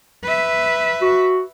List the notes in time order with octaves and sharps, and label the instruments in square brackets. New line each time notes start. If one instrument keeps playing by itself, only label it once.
[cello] B4 E5
[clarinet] F#4